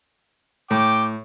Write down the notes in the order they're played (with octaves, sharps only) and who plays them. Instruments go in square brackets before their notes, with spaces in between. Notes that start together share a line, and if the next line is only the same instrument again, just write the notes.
[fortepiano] A2 [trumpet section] G5 D6